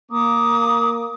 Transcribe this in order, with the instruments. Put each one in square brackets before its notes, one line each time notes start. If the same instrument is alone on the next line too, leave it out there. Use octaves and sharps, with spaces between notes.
[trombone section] A#3 [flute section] A#5 D6 D#6